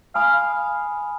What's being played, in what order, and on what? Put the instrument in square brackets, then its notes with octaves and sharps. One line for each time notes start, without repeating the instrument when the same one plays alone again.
[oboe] F5 [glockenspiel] G#5 B5 D#6